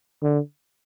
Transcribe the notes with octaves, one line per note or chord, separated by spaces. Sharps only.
D3